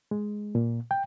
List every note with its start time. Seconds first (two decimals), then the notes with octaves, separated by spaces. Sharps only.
0.11 G#3
0.55 A#2
0.91 G5